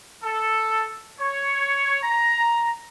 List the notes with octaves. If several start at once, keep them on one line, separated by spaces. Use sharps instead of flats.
A4
C#5
A#5